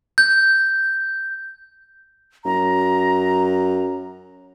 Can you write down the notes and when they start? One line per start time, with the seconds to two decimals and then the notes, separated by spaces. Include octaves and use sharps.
0.18 G6
2.45 F#2 A#5